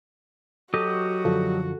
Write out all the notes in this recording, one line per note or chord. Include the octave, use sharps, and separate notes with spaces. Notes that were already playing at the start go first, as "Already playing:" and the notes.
F#3 F#4 G4 A4 D#5
F#2 D3 F3 A4